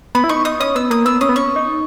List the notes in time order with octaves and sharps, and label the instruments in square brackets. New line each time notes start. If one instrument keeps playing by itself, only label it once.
[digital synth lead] B3 [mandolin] B5
[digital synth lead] E4
[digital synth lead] D#4 [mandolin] C#6
[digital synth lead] D#4 [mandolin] D#6
[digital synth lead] C#4 [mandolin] D#6
[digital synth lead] B3 [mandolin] E6
[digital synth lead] A#3 [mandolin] D#6
[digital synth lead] B3 [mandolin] E6
[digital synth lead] C#4 [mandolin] D#6
[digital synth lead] B3
[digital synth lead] C#4 [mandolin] C#6
[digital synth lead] D#4